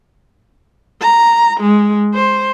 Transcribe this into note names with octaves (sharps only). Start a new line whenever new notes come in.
A#5
G#3
C5